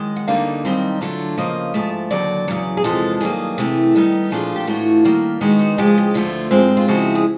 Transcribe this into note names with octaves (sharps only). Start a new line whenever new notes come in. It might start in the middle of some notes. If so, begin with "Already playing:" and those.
Already playing: F#2 D#3 G#3
F#5
D2 D3 G3 A#3 D#4 F5
F#2 D#3 G3 C4 D#4
D3 F#3 A3 D4 F4
C#3 F3 A#3 D#5
G#2 F3 A3
D#2 D3 F#3 D5
E2 C#3 F#3
G#4
E2 C3 F3 G#3 A4
G2 D#3 F#3 A#3 G#4
C3 E3 A3
G2 D#3 G3 B3 D#4
A#2 F3 A3 D4 F4 G#4
G4
A2 E3 A3 D4 F4 F#4
D#3 G3 A#3
D#3 G#3 B3 D#4 F#4
F#4
C#3 F3 G#3 G4
G#4
G4
D2 D3 F3 A3 F4
G#2 F3 G#3 C4
F4
C#3 F3 G#3 C4 E4 F#4
G#4